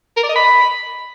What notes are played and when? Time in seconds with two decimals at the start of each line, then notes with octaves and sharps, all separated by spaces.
0.17 A#4
0.23 D5
0.29 D#5
0.36 B5